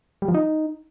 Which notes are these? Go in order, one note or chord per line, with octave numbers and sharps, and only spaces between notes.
G3
F3
D#4